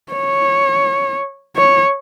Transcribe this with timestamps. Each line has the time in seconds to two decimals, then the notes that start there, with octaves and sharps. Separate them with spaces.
0.13 C#5
1.56 C#5